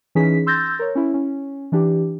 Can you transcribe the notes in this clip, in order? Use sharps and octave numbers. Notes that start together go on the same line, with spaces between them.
E3 C#4 D#4 G#4 B6
C6 E6 G6 A6 A#6
A#4 C#5
C#4 E4
C#4
E3 D4 G4